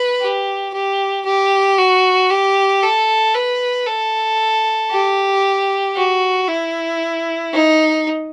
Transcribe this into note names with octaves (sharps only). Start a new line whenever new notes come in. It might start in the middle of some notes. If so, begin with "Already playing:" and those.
Already playing: B4
G4
G4
G4
F#4
G4
A4
B4
A4
G4
F#4
E4
D#4